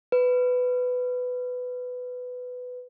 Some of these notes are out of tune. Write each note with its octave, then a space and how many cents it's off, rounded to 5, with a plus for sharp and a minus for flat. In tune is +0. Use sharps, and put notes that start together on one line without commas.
B4 +15